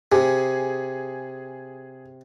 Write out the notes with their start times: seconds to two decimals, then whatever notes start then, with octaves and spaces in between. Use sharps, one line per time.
0.12 C3 G#4